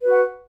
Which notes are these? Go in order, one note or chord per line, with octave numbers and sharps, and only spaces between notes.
F#4 B4 F#5